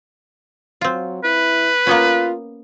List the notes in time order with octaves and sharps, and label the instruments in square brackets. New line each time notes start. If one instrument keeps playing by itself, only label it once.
[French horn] F#3 [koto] C4 F4
[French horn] E4 [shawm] B4
[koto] A#3 B3 C#4 [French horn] F4